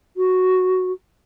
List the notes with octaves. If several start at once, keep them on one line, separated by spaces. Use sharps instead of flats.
F#4